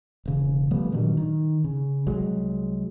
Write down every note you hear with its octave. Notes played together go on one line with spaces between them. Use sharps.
E1 C#3
F3 G3 A3 B3
G2 A#2 D#3 F#3
D#3
C#3
C2 F#3 G#3